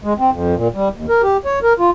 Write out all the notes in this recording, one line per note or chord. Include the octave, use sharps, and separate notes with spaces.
G#3
C4
F2
A#2
G3
D#2
A#4
G4
C#5
A#4
F4